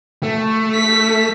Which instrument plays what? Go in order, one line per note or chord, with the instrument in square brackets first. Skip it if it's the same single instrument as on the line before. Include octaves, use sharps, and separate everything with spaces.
[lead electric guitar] A3
[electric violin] B6